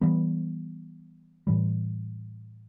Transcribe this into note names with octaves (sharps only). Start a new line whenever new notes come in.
E3 G3 B3
A2 E3 G3